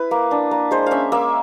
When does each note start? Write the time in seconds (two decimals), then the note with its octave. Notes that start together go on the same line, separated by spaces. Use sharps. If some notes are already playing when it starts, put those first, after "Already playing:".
Already playing: E4 B4
0.11 A#3
0.31 D4
0.51 A#3
0.71 G#3 C5
0.87 C#4 E5 F5
1.12 A#3 E5